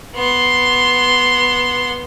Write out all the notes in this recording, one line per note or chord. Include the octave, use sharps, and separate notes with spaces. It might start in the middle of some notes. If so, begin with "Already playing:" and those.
B3 C6